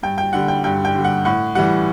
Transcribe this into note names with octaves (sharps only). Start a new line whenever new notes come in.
G2 G5
G5
D3 G3 F#5
G5
G2 G5
G5
D3 G3
F#5
A2 F#5
E3 G3 F#5